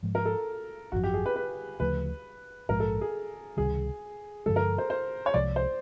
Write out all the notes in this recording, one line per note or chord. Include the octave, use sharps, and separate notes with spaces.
G#2 F3 G#3
A#4
A4
G#1 F#2 C#3 F3 F#4
G4
G#4
B4
B4
D2 C#3 F3 A3 B4
A#1 G#2 F3 G#3 A#4
A4
G#4
C#2 C3 D#3 G3 G#4
G2 D3 F3 G#3 A4
A#4
C5
C5
C#5
C2 C3 F3 G#3 D5
C5